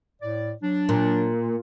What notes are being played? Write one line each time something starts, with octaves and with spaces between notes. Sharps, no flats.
A2 D5
F#3 D4
A#2